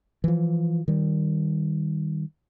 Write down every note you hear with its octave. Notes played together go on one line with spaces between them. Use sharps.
E3 F3
D#3 G3